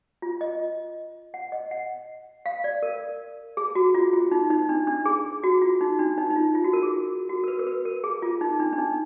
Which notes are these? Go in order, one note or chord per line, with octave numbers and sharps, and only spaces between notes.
F4
D#5
F#5
D#5
F#5
F5
D5
A#4
G#4
F#4
F4
F4
D#4
D#4
D4
D4
G#4
F#4
F4
D#4
D4
D#4
D#4
F4
F4
F#4
A#4
G#4
F#4
A#4
B4
A#4
B4
A#4
G#4
F4
D#4
D4
D4
D#4